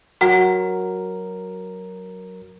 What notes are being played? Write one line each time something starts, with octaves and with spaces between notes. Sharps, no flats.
F#3 F#4 A#4 F#5